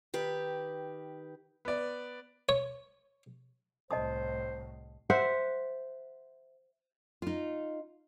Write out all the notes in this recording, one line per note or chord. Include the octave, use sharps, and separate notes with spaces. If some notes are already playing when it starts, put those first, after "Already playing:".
D#3 G4 B4
B3 D5
C#5
C2 A2 C5 D#5 A5 D#6
C5 E5 F#5
D#4 F4